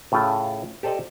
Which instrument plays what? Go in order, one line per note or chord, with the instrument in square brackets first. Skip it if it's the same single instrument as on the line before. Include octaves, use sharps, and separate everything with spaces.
[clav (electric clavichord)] A2 C#3 A3 F4
G4 A4 C5 D5 D#5 A5